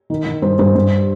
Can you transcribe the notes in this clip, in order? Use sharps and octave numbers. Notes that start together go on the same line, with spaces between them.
D#3
D#3
G2 C5
G2 C5
G2